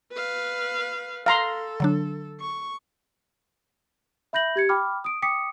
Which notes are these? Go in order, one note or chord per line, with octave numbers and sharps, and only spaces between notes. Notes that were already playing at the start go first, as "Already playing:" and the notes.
B4 F5
A4 F5 A#5 C6
D3 F#3 D4
C#6
E5 B5 G6 A#6 F#7
G4 G#6 C#7
G5 B5 D6 F6
D#6 D7
G5 D6 D#6 B6 C#7